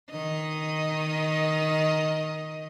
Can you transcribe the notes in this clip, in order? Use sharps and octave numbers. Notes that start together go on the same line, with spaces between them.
D#3 D#5